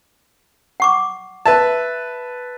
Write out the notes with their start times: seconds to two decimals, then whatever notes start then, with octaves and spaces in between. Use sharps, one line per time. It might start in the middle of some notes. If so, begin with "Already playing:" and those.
0.80 F#5 C#6 D6
1.46 B4 E5 A5